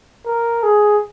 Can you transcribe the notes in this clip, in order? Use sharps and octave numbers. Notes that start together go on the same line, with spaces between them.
A#4
G#4